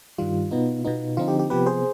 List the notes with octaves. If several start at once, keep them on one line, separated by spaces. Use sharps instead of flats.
G2 D#3 G3 F4
B2 B3 D#4
B2 B3 D#4
D3 F3 C4 D#4 F4
G4
G4
C3 F3 B3 G4 B4
G#4 C5